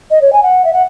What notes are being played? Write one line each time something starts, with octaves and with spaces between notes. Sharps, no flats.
D#5
C#5
G#5
F#5
E5
F#5